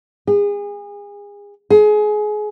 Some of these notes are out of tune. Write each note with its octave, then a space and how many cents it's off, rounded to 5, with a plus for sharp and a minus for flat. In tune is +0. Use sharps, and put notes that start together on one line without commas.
G#4 -30
G#4 +25